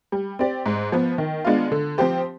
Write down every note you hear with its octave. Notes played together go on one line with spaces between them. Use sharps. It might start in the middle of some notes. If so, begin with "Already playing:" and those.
G3
C4 G4 D5
G#2
F3 B3
D#3
G#3 B3 D4 F4
D3
F3 C4 G4 C5